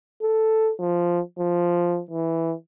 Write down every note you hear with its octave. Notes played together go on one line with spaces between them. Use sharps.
A4
F3
F3
E3